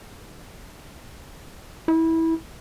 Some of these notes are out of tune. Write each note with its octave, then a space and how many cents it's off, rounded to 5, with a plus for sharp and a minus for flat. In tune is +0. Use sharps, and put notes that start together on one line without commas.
E4 -20